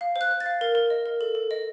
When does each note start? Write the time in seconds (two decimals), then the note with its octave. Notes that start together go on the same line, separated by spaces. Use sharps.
0.01 F5
0.16 C5
0.21 F#6
0.31 C5
0.40 A6
0.46 F5
0.61 A#4
0.75 A#4
0.90 D#5
1.06 A#4
1.21 A4
1.35 A4
1.51 D#5